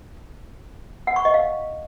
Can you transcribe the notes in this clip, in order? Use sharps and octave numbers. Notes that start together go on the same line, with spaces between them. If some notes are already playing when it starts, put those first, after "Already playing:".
F#5
C#6
D#5
F5